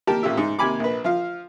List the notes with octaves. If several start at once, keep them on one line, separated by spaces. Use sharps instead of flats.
D#2 G4 A#4 A5
A1 A#2 G4 E5
G#2
D#2 C3 G#5 B5 D6
A#1 B4
F3 F4 F5